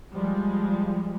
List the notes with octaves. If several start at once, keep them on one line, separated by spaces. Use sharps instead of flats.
F3 G3 G#3